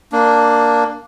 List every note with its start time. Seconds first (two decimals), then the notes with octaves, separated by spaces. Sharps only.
0.12 A#3 D4